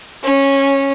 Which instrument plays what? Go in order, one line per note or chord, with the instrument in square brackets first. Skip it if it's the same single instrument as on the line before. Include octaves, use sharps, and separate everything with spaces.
[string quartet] C#4